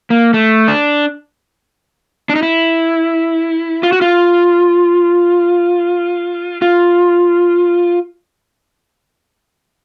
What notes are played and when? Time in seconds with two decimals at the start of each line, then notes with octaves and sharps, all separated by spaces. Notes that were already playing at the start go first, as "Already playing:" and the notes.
0.10 A#3
0.34 A3
0.68 D4
2.29 D4
2.36 D#4
2.43 E4
3.83 F4
3.93 F#4
4.01 F4
6.62 F4